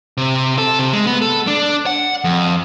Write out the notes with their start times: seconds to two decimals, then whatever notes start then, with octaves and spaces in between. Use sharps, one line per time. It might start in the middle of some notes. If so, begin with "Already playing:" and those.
0.17 C3
0.58 A4
0.79 C3
0.93 G#3
1.07 B3
1.22 A4
1.47 D4
1.86 F#5
2.24 F2